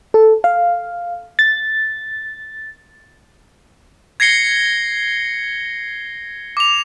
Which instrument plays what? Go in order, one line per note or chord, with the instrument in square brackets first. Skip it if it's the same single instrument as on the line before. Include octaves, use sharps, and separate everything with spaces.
[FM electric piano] A4
F5
A6
[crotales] G#6 A#6 C7 C#7 G7
D6 F7